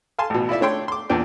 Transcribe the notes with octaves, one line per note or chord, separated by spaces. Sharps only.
F5 G#5 A5 C6
A1 B2
E4 F4 D5 E5
A3 D4 C#5 G5 C6
C6 D6
E2 A#2 D4 G5